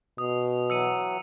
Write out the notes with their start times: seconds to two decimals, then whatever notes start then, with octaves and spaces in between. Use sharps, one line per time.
0.18 B2 D#6
0.70 E3 F#3 E6 C#7 D#7